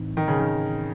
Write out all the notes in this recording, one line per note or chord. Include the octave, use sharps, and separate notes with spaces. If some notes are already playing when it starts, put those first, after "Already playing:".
Already playing: A2 E3 C4 D#4
D#3
C#3
D#3